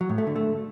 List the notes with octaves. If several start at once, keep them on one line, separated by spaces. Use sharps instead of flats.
F#3
A2
A3
D3
A3